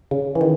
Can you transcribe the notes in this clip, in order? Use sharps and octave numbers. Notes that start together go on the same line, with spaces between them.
C#3
E3
D#3